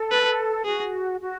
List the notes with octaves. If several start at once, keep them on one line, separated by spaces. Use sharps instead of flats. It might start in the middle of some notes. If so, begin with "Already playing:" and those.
Already playing: A4
B4
F#4 G#4
F#4